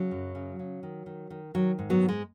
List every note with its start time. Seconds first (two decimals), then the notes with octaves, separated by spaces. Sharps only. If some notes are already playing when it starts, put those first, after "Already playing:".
Already playing: C#3 F#3
0.11 F#2
0.35 C#3
0.59 C#3
0.83 D#3
1.06 D#3
1.30 D#3
1.54 D#3 F#3
1.79 G#2
1.90 F#3 B3
2.02 G#2
2.08 G#3